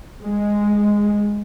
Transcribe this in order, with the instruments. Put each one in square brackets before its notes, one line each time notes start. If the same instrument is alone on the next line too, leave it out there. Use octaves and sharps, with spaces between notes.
[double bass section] G#3